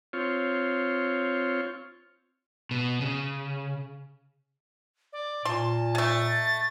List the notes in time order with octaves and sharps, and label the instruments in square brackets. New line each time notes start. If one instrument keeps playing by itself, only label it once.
[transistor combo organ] C4 F4 C#5
[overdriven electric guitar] B2
C#3
[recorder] D5
[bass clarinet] A#2 [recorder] A5 [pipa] C6
[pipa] G#3 A3 [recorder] A6